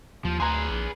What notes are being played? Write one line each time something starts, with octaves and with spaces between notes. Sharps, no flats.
D#2 F3
D2 G#4 B4 G#5 A#5 C6
A#1